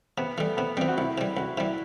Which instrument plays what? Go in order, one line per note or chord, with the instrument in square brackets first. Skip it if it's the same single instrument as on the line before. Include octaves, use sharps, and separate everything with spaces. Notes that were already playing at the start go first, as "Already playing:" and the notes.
[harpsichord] C3 [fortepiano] B3
[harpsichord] E3 G3 [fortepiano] A3
[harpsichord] C3 [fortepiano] B3
[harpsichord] E3 G3 [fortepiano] C4
[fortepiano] F#4
[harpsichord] C2 [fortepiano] E4
[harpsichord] C3 G3
[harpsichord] C2 [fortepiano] F#4
[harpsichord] C3 G3 [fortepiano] E4